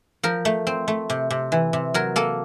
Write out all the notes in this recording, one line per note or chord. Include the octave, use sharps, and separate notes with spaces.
F3 A#4
A3
C4
A3
C3
C3
E3
C3
F#3 A#4
A#3 A4